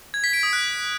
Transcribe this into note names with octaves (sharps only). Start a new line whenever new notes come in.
G#6
B6
D7
D#6
F#6